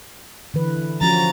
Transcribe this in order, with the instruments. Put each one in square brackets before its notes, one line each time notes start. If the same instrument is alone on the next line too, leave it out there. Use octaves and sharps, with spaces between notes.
[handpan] D3 E3 B4
[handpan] F3 C#4 F#4 [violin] A#5 A6